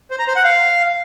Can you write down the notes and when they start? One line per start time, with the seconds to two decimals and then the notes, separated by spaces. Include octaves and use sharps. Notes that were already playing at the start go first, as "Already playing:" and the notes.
0.11 C5
0.19 A#5
0.27 C5
0.36 F#5
0.44 F5